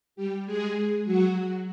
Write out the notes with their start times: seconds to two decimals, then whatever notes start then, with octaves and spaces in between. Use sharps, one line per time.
0.16 G3 G4
0.46 G#3 G#4
1.05 F#3 F#4